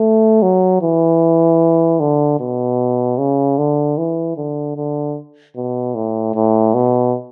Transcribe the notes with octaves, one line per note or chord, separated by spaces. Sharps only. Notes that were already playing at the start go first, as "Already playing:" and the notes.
Already playing: A3
F#3
E3
D3
B2
C#3
D3
E3
D3
D3
B2
A2
A2
B2